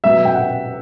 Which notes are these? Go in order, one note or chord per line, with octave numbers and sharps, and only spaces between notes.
B2 F#3 B3 E5
G5
F#5